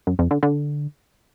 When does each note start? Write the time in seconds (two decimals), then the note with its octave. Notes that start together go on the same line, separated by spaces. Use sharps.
0.07 F#2
0.19 F2
0.31 D3
0.43 D3